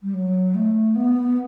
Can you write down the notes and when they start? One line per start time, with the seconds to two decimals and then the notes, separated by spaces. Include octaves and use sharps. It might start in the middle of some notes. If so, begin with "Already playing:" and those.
0.02 G3
0.14 F#3
0.54 A3
0.95 B3